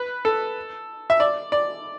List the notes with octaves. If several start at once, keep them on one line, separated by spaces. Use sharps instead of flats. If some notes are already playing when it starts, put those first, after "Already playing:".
Already playing: B4
A4
E5
D5
D5